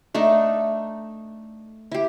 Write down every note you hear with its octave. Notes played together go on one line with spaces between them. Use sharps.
A3 D4 D#4 A4
E4 G4